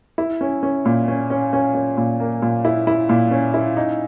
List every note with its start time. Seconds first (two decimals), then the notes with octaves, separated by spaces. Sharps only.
0.18 E4
0.41 C#4
0.63 C#4
0.85 A#2
1.08 C#4
1.30 C#4
1.53 C#4
1.75 C#4
1.97 A#2
2.20 A#3
2.42 A#2
2.65 E4
2.87 E4
3.09 A#2
3.31 C#4
3.54 E4
3.77 D#4